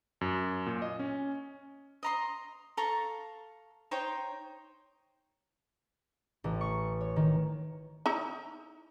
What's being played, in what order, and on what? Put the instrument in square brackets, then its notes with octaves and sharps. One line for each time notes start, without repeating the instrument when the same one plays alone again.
[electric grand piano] F#2
A#2
D#5
C#4
[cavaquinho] D#5 A#5 C6
A4 F5 A#5 C#6
D#4 C5 C#5 G5
[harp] A1
C#6
C#5
D#3
[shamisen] D#4 E4 A#5